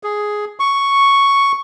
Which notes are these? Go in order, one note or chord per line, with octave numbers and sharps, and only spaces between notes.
G#4
C#6